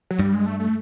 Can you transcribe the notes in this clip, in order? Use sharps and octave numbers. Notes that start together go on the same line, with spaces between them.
F#3
G2 G3
G#3
A3
A3